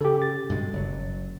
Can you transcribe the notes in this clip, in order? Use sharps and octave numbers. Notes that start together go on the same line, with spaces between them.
C#3 G4 A4
A6
G2 B2 G#3
F#1 F#3